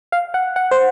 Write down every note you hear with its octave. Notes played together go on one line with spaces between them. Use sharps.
F5
F#5
F#5
C5